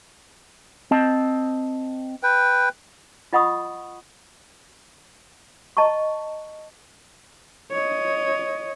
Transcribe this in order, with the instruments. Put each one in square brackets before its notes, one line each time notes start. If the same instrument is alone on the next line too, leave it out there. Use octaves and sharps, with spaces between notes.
[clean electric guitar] C4 D#5 A5
[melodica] B4 G5
[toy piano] F4 D#5 F#5 B5 C#6 D#6
D#5 A5 A#5 C#6
[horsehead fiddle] C#5 D#5